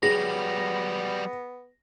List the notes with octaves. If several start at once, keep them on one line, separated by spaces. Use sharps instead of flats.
F#3 G3 B3 G#4 A#6